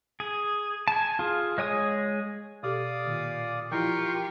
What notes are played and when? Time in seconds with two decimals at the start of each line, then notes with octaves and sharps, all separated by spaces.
0.20 G#4
0.88 G#5 A5
1.19 F4 G#4
1.58 G#3 C#5 G#5 D#6
2.63 B2 G4 A4 D5 F5 D#6
3.06 A#2 D#3
3.72 E3 F3 E4 F4 G4 A#4 G5 C#6